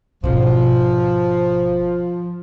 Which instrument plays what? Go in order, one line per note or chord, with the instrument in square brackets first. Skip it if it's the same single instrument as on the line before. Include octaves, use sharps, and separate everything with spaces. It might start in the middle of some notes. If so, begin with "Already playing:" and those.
[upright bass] G#1 B2 [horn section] F3